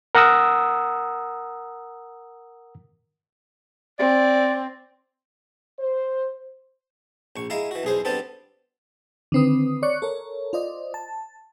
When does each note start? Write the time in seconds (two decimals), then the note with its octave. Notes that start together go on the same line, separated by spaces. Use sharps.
0.15 A#4 F#5 A#5 D#6 E6
3.99 C4 D5
5.79 C5
7.36 A#1 C#6
7.50 G#3 E4 F5 A#5
7.71 E3 F#4
7.83 B1 E2 G#4 C5
8.05 G3 B3 C4 D4 A4
9.32 D3 D#3 C4 B4 D#6
9.82 C#5 D5 C#6 F#6 C#7
10.02 A4 A#4 C#5
10.53 F4 C5 D5 D#5
10.94 A5